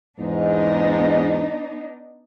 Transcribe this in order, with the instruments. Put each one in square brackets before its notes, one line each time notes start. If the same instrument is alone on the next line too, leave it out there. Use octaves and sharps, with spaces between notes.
[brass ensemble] E2 G#2 [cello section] B3 D4 D#4